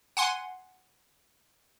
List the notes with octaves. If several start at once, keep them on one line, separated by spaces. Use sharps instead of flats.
F#5 G#5 C6